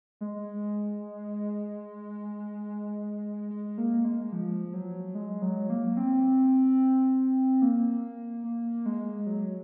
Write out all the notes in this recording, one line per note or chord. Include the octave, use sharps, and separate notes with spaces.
G#3
G#3
A#3
G#3
F3
F#3
G#3
F#3
A#3
C4
A#3
A#3
G#3
F#3